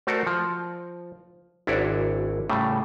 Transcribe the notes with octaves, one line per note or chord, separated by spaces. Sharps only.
A3 F#4 A4 A#4 C5 D5
F3
G#1 D4 E4 F#4 C#5 D5
A2 C#3 G3 A3